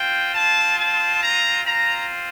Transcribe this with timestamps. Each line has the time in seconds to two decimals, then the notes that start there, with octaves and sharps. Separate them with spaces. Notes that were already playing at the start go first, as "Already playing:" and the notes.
Already playing: C4 F4 G5
0.33 A5
0.77 A5
1.21 A#5
1.65 C4 F4 A#5